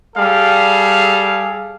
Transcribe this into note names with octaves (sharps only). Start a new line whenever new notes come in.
G3 G#4 A4 F5